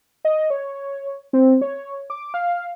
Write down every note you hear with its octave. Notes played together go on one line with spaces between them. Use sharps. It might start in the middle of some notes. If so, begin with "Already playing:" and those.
D#5
C#5
C4
C#5
D6
F5